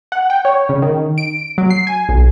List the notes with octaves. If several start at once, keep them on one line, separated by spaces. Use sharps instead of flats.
F#5
G5
C#5
C#3
D#3
D7
F#3
C7
G#5
B1